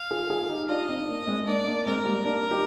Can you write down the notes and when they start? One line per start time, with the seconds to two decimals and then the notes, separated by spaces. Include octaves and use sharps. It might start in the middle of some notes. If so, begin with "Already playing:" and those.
Already playing: F5
0.10 F4 G#4
0.30 F4 G#4
0.49 D#4 G4
0.69 D4 F4 D#5
0.89 C4 D#4
1.08 A#3 D4
1.27 G#3 C4
1.46 A#3 D4 D5
1.66 A#3 D4
1.86 G#3 C4 A#4
2.05 G3 A#3
2.25 A#3 D4
2.50 D#4 G4